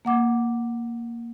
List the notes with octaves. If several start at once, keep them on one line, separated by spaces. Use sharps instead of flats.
A#3 F#5 D6